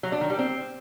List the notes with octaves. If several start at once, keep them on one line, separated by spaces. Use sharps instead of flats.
F#3
D4
D#3
G3
C4